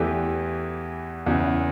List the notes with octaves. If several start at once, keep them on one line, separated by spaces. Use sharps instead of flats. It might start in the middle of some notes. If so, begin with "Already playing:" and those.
Already playing: E2 E3 A3 G4
E2 C#3 E3